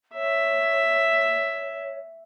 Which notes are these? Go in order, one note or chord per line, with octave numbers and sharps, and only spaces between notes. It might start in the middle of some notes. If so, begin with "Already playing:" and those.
C#5 E5